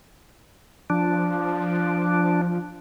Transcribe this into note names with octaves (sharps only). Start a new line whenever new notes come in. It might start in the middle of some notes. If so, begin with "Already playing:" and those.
F3 D4